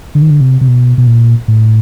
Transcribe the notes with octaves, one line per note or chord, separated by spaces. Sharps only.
D3
D#3
D3
C3
C3
B2
B2
A#2
A2